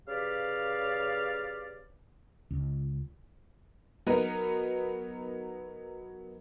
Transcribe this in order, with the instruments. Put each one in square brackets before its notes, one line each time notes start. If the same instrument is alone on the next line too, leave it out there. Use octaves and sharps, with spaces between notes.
[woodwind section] C#3 G4 B4 D5 F5
[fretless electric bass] C#2
[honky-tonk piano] F#3 B3 D#4 A#4 B4